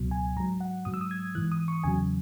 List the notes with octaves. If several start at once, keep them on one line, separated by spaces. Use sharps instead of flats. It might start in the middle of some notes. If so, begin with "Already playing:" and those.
Already playing: C#2 B2 F#3
G#5
G#2 F#3 A#5
F#5
G#2 F#3 D#6
E6
D#6
G#6
G#2 E3 F#6
D#6
C#6
E2 C#3 F#3 G#5